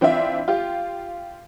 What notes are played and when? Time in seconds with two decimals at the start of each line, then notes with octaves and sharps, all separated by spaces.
0.01 E3 C4 D4 F4 E5
0.48 F4 G4